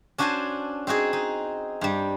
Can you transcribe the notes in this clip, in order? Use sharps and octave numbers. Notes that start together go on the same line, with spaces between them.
C#4 D4 F#4 C5 G#5 A5
C4 D#4 F#4 G#4
D#4
G2 G3